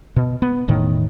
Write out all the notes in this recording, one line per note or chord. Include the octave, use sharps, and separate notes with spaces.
B2
B3
E1 A2 D#3